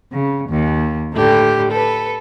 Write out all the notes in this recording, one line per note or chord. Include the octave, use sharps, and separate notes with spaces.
C#3
D#2
A2 D3 G3 G4
A4 B4